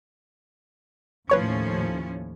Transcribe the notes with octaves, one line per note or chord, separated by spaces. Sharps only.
D#2 A2 F3 C#4 B4 C#5 C#6